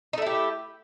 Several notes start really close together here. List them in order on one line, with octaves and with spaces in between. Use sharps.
D#4 A3 E4 G4